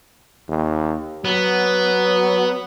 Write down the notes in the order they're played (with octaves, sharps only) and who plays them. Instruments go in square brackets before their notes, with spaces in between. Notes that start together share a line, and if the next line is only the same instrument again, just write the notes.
[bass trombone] D#2
[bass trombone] F#3 [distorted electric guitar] B3